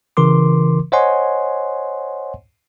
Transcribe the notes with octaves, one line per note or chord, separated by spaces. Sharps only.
C#3 E3 A#4 C6 D6
C5 C#5 D#5 F#5 G#5 C6